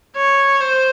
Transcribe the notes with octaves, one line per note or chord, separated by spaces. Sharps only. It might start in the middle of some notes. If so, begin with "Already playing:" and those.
C#5
C5